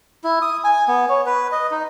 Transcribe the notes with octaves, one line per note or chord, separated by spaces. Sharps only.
E4
D#6
G#5
B3
C#5
B4
D#5
D#4